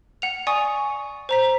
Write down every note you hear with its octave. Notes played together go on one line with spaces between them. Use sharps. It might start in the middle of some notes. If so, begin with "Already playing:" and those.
F#5 F7
D5 F#5 G#5 C#6 D#6
C5 A#5 B6